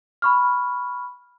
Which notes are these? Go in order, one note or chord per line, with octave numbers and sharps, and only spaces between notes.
B5 C#6 F6